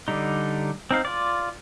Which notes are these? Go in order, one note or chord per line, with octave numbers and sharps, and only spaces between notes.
D3 G3 D#4
C4 D#4 F5
F4 D5